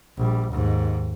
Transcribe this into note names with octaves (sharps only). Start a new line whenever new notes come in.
A#1 G3
D#2 G#2